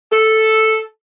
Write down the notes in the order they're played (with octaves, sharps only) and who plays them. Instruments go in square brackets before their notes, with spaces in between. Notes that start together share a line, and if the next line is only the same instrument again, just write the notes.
[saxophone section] A4